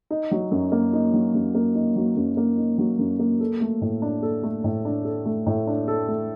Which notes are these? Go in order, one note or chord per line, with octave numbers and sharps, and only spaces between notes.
D#4
F#3
F#2
A#3
D#4
F#3
F#2
A#3
D#4
F#3
F#2
A#3
D#4
F#3
F#2
A#3
A4
A3
A2
D4
A4
A3
A2
D4
A4
A3
A2
D4
A4
A3